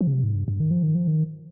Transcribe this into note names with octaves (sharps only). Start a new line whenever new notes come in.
F3
C#3
C3
G#2
G2
G2
D#3
F3
D#3
F3
D#3